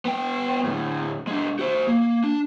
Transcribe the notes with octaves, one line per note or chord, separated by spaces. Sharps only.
B3 G5
D2 A2
G#3 D4
F#4 C5
A#3
D4